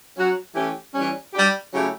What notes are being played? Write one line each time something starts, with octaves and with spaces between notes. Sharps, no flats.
F#3 C#4 F#4
E3 A3 C#4 G4
E3 G3 C#4
G3 D4 G4
C#3 F#3 A3 E4 G4